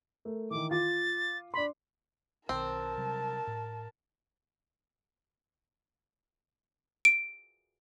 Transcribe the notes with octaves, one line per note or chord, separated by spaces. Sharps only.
A3 A#4
D#3 E3 D6
F4 D6 A6
D4 B5 C6
B1 D#3 C4 A#4 A5
C3 F#3 G3
A2
D7